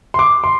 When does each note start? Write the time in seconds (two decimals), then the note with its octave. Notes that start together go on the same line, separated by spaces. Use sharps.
0.14 C6
0.19 D6
0.44 C6